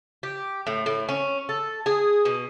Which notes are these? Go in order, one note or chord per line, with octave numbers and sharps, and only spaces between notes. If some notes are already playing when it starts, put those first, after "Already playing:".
G4
A2
A2
C#4
A4
G#4
B2